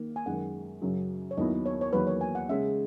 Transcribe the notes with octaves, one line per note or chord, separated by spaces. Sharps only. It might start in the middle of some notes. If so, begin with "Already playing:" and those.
Already playing: D#3 A#3
G#5
F#2 D#3 G#3 F#5
F#2 C#3 F#3
C#5
D#2 D#3 F#3 B3 E4 D#5
C#5
C#5
E2 D#3 F#3 A#3 B4
C#5
G#5
F#5
C#3 G#3 C#4 E5